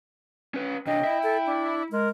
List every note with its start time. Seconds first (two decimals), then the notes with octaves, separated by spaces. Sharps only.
0.54 C#4 B4
0.87 C3 D4 D#5 G5
1.04 E4 E5
1.23 A4
1.46 D4
1.92 G#3 A#4